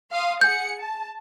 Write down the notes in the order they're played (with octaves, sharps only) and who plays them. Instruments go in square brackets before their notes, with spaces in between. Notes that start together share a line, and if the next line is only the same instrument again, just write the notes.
[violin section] F5 C6 D#6
[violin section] G#4 F#5 C#7 [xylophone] G6
[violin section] A5